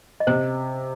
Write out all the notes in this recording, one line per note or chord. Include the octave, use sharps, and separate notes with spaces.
D#5
C3 C5